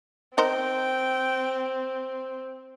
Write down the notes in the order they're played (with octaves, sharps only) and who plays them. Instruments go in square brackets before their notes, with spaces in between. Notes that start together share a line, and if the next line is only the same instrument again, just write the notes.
[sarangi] C4 [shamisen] D#4 A#4 C5 [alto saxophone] G5